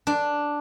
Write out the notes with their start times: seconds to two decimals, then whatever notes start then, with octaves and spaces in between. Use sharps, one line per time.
0.07 D4